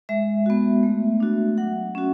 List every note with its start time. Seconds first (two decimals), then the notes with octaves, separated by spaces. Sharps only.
0.09 G#3 E5
0.46 B3 F#4
0.83 A3
1.20 D4 F#4
1.58 F#3 F#5
1.95 C#4 F#4